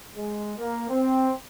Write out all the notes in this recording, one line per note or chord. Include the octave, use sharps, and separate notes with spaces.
G#3
A#3
C4